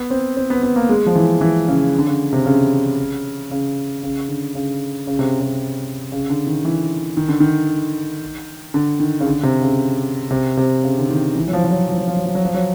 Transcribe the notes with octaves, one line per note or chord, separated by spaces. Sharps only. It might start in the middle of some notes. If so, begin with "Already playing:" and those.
Already playing: B3
C4
C4
B3
B3
A#3
G#3
F3
E3
E3
C#3
D3
C#3
C3
C#3
C#3
C#3
D3
C#3
C#3
C3
C3
C#3
D3
D#3
E3
D#3
D3
D#3
D3
D#3
C#3
D3
C3
C#3
C3
C3
C#3
D3
D#3
E3
F#3
F3
F3
F#3
F3
F#3
F3
F#3
F3
F#3
F3
F#3